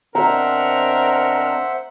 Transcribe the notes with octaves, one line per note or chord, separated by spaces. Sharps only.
B2 C4 D4 A#4 C5 E5 F#5 A#5